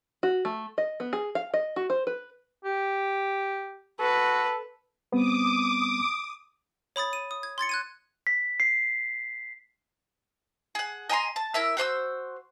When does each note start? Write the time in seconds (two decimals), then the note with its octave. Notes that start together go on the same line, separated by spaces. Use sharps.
0.23 F#4
0.45 A3
0.78 D#5
1.00 B3
1.13 G#4
1.35 F5
1.54 D#5
1.76 F#4
1.90 C5
2.07 B4
2.64 G4
4.00 F#4 A4 B4
5.12 G3 B3 C4 D6 D#6
6.96 C#5 B5 D#6 A6
7.13 D#7
7.31 D#6
7.43 G#6
7.58 C6 G#6 A6 C#7
7.69 F#6 G#6 D#7
8.27 B6
8.60 C7
10.75 G#4 F#5
11.09 D#5 G#5 A#5 C6
11.36 A5
11.54 E4 A#4 E5
11.77 F#4 C5 C#6 E6